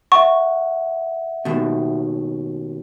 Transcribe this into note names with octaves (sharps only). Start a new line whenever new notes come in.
E5 F#5 C#6
D#2 B2